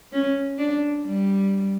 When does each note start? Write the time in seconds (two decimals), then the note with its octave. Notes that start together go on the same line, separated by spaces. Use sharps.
0.12 C#4
0.58 D4
1.06 G3